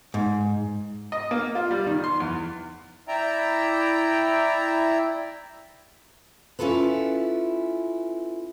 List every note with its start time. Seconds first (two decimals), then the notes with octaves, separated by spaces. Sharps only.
0.14 G#2
1.12 D#5
1.31 A#3
1.55 F4
1.71 G3
1.86 D#3
2.04 C6
2.20 E2
3.08 E4 D5 E5 G5 A#5
6.59 C#4 E4 F4 A4 B4